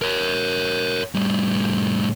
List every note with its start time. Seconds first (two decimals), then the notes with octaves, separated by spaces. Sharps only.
0.02 A#4 C#5
1.15 A2 G3